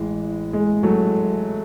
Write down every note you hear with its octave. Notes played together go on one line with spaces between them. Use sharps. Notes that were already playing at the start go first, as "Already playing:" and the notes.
Already playing: A1 E3 G#3
G#3
F#3 A3